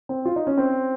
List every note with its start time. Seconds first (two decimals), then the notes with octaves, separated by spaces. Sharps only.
0.09 C4
0.25 F4
0.36 D#4
0.47 C#4
0.58 C4